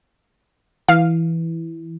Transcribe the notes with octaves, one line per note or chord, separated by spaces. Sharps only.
E3 F5